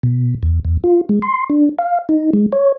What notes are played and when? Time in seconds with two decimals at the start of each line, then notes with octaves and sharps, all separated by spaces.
0.03 B2
0.43 E2
0.65 E2
0.84 F4
1.09 G#3
1.22 C6
1.50 D4
1.79 F5
2.09 D#4
2.33 G#3
2.52 C#5